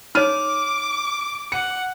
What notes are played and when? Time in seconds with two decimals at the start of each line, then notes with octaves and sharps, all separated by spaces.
0.15 D#4 C#5 D6 F6 D#7
1.52 F#5 C#7